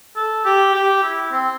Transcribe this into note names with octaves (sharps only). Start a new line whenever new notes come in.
A4
G4
G4
E4
C4